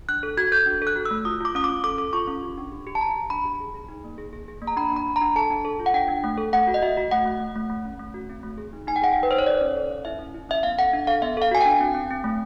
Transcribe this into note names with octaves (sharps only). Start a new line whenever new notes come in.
D4 F#6
A4
F#4 G#6
A4 G6
D4
A4
F#6
F#4
E6
A3
F4 D#6
F4 D6
C#4 D#6
D6
C#4
A4 D6
A4 D6
F4 C#6
C#4
G4
D4
G4
G4
A5
G4 A#5
G4
D4 B5
G4
G#4
G#4
D#4
A#3
G#4
G#4
G#4
A#3
A#5
D4 B5
D4 B5
D4
A#5
D4
A4 A5
D4
A4
F4
F#5
D4 G5
D4
A3
A4
A3 F#5
F#4
D#5
F#4 E5
F#4
A3 F#5
A3
A3
A3
A3
C#4
A3
F#4
C4
A3
G#4
D#4
D#4 G#5
G5
G#4 F#5
D#4 G5
B4
D#4 C5
C#5
A4 D5
C#4
A4
C#4
E4 E5
C#4
E4
C#4 E5
B3 F5
A4 F#5
D4
A4 F5
B3 E5
A4 F5
F#4 G#5
D4 G5
C4
C4
C4
A3